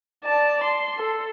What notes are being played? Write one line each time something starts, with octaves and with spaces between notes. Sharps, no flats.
D5 A5
C6
A4